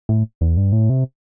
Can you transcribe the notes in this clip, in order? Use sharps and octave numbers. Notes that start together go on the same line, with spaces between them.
A2
E2
G2
A2
C3